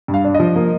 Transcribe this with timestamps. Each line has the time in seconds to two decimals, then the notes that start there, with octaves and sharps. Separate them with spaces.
0.08 G2
0.14 F5
0.24 D4
0.35 D#5
0.40 F3
0.56 A#3